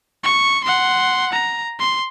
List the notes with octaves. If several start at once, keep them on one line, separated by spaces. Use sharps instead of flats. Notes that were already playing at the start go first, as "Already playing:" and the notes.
C#6
F#5 C6
A#5
C6